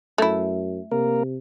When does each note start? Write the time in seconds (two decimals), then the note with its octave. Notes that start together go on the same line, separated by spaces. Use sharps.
0.18 F#2 A3 E4
0.92 C3 A#3 A#4